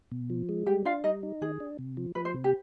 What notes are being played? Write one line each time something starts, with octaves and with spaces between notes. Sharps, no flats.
B2
F3
G#3
G3 G4 G5
D4 F4 F5
G3 D#4 D#5
D#4
D#3 G#4
D4
C3
F3
F3 B4
C5
C3
G4